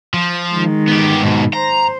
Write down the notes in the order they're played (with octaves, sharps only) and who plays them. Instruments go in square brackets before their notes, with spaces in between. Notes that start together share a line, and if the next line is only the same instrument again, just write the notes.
[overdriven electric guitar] F3
[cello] D#3 G#3
[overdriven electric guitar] B3 G4
G#2 B2
[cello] C5 [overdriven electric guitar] A#5